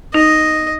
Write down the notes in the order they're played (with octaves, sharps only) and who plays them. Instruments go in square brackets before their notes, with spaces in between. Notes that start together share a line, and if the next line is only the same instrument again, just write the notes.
[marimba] D#4 [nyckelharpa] D#5